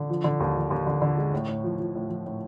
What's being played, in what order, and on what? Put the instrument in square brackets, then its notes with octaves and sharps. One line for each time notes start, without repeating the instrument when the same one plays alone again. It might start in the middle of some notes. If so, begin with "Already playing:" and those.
Already playing: [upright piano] D3
F3
D3
D#2
F3
D#2
D3
D3
G#3
A2
A2
F3
F3
A2
F3
A2